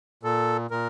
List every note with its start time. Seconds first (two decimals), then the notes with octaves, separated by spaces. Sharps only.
0.23 A#2 A4
0.71 A#2 A#4